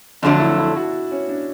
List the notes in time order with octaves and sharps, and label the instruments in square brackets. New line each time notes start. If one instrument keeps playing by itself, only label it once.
[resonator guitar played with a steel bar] F2 D3 F#3 A3 [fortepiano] D4
[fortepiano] E4
E4
F#4
C#4
D4